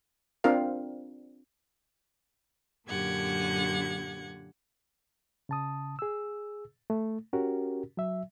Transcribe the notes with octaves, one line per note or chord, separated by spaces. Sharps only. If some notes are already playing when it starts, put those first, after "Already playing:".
C4 D4 F4 A#4 F5
F#2 A#2 D3 G4 F#5 G#6
C#3 A5 D#6
G#4 E6
A3
C#4 F#4 G4 A#4
F#3 E5